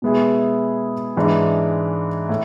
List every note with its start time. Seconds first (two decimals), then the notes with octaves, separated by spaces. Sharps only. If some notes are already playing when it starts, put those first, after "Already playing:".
0.02 B2 G#3 B3 E4 G#4
1.17 G#2 E3 G#3 D4
2.29 A2